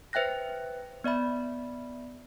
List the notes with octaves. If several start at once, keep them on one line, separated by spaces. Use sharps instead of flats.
B4 C5 E5 G5 F#6 A#6
B3 D5 E5 B5